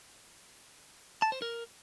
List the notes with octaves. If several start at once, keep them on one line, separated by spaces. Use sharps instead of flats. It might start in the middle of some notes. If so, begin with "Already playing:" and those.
A5
C5
A#4